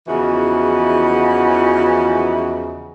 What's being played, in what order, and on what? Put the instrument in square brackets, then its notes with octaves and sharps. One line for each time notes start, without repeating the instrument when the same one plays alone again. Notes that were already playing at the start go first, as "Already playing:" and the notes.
[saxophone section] E2 C#3 E3 F3 F#4 D#5